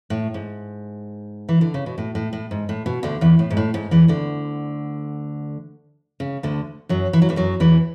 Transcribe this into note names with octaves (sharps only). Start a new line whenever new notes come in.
A2
G#2
E3
D3
C#3
B2
A2
A2
A2
G#2
A2
B2
D2 D3
E2 E3
A2
G#2
A2
G#2
E2 E3
D2 D3
C#3
D2 D3
F#2 F#3
E3
F#3
E2 E3
F#2 F#3
E2 E3